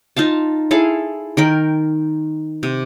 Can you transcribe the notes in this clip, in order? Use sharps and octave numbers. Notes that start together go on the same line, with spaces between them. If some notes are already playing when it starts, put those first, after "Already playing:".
D#4 F4 F5 A5
E4 G#4 A4 F5
D#3 A#4 G5
C3